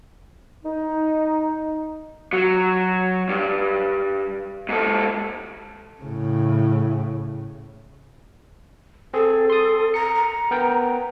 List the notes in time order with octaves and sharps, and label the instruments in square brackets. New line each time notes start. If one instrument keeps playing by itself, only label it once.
[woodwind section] D#4
[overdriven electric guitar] F#3
G2
G#2 A4
[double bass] A2 C#3
[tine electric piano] C4 G#4 [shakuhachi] A4
[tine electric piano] C6 D#6
[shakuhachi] A#5 [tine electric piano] C#7
[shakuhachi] A#5
[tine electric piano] B3 A#4 G5